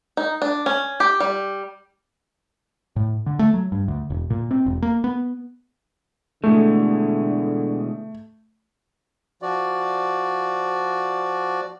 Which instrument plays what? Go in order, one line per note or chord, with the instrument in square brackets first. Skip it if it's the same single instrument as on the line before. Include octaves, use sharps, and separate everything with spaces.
[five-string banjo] D#4
D4
C#4
G4
G3
[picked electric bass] A2
D3
A3
F#3
G2
D2
E1
A#2
C4
E1
A#3
B3
[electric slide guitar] B2 E3 G#3 [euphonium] D3 [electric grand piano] A3
[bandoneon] F3 F#4 D5